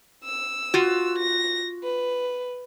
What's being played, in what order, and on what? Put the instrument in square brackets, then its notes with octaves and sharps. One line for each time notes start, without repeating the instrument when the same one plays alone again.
[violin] E6
[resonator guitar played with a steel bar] F4 F#4
[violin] A#6
B4